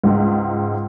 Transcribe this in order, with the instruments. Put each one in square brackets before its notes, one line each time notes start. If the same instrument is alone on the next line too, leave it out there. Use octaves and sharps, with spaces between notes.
[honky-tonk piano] C#2 G#2